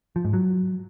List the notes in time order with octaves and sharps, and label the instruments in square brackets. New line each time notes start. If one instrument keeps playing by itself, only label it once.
[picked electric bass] F3
G#2
F#3